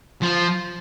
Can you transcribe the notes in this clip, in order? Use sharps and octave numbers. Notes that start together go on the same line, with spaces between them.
F3